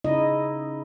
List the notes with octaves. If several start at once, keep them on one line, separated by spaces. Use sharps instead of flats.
C#3 D#4 E4 D#5